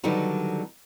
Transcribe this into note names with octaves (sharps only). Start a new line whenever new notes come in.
D3 D#3 F#3 G3 B3 D#4